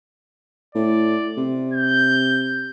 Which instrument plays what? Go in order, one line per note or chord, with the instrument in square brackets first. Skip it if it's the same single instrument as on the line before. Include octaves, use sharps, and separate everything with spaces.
[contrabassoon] A2 [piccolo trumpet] D5
[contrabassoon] C3
[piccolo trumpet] G6